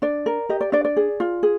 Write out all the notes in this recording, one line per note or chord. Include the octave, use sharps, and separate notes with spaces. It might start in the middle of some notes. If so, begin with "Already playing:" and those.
D4 D5
A#4
G4 D#5
D5
D4 D5
D5
G#4
F4
G#4